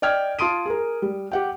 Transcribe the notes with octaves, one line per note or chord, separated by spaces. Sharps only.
D5 D#5 G5 F6 G#6
F4 A5 C6 D#6 D7 D#7
G#4 A#4
G3
G4 F#5 G5